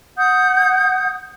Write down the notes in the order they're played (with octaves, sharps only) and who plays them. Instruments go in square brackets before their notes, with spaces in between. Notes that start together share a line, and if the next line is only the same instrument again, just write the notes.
[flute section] F#5 D#6 G6